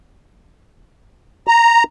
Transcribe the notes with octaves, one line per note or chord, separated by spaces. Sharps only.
A#5